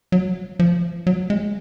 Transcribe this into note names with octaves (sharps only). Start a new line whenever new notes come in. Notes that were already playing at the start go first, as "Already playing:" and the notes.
F#3
F3
F#3
G#3